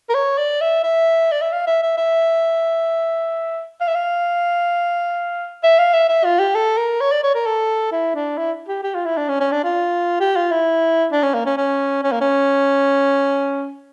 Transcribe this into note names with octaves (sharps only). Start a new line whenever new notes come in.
A#4
C#5
D5
E5
E5
D5
E5
F5
E5
E5
E5
F5
E5
F5
E5
F5
E5
E5
F4
G4
A4
A#4
C#5
D5
C#5
A#4
A4
E4
D4
E4
G4
G4
F4
E4
D4
C#4
C#4
D4
F4
G4
F4
E4
D4
C#4
A#3
C#4
C#4
C#4
A#3
C#4